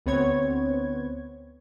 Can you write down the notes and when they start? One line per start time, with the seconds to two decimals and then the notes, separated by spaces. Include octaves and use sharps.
0.06 D2 B3 C4 C#5 G#6